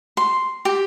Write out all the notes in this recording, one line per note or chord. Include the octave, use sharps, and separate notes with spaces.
C6
G4